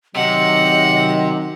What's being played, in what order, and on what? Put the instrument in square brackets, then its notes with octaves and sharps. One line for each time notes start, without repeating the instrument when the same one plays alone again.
[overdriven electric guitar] C3 [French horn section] D#3 F#3 [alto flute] D#5 [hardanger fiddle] F#5